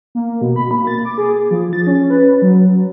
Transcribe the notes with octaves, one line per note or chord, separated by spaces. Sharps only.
A#3
B2
B5
A#3
A6
D6
G#4
F3
A6
C#4
B4
F#3